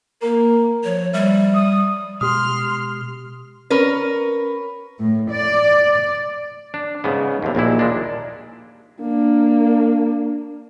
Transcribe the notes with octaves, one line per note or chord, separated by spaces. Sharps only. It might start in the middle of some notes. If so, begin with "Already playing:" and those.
A#3 A#4
F3 C#5
G3 E5
D#6
B2 G#3 G4 C6 D#6 F6
C#4 A#4 B4
A2
D5
D4
G#2 C#3 B3
D#2 C3
A#1 D#2 A#2 E4
A#2 G#3 D4
A#3 D4